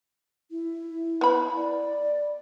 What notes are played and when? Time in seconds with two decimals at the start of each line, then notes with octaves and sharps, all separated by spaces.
0.51 E4
1.21 B3 B5
1.56 D5